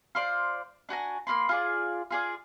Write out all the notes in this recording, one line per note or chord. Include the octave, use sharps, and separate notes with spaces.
F4 C5 D5
D4 F#4 G#5 A#5
A#3 F#4 B5 C6
F4 G#4 D5
F4 G#4 D5